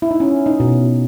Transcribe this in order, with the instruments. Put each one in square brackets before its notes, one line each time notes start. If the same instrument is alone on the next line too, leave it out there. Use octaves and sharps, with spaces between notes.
[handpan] E4
D#4
C#4
D#4
B2